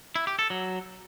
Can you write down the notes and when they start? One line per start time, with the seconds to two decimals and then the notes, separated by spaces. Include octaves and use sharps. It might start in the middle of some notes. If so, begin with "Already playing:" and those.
0.16 E4
0.27 G4
0.39 A4
0.50 F#3